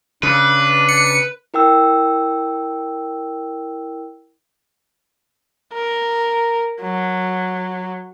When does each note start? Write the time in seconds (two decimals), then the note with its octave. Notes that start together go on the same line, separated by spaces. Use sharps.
0.23 C#3 D4 B4
0.89 C#7
1.54 E4 A#4 G5 E6
5.74 A#4
6.82 F#3